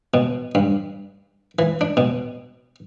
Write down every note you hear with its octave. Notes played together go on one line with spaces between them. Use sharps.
B2
G2
E3
D4
B2